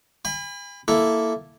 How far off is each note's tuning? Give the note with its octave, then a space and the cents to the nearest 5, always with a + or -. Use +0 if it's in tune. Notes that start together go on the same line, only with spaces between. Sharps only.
G#5 -45 B5 +15
A#3 +0 E4 +0 A4 +0